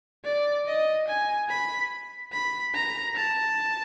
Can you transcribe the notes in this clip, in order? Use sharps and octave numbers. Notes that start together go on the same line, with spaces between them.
D5
D#5
G#5
B5
B5
A#5
A5